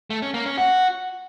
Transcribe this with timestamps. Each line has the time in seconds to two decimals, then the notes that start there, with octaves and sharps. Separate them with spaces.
0.10 A3
0.22 C#4
0.34 A#3
0.46 C#4
0.58 F#4